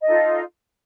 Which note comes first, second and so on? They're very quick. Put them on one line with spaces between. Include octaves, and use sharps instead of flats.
D#5 A4 D#4 F4